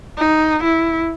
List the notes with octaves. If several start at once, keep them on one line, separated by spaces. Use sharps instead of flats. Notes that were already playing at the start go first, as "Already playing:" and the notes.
D#4
E4